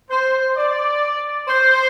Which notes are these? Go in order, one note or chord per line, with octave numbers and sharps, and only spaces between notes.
C5
D5
C5